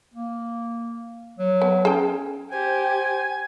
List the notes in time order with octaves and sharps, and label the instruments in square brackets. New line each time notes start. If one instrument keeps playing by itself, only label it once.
[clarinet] A#3
F#3
[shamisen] B3
[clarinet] C#4 [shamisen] G#4 A4 G5
[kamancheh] G4 [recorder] C5 [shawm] G#5